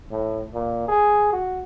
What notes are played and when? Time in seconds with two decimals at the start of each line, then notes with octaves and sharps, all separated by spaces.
0.11 A2
0.53 A#2
0.88 G#4
1.33 F#4